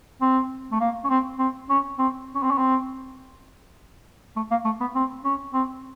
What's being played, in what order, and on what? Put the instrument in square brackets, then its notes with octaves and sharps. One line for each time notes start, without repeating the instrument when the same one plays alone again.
[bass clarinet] C4
A3
A#3
C#4
C4
C4
C#4
C4
C#4
C4
C#4
C4
A3
A#3
A3
B3
C4
C#4
C4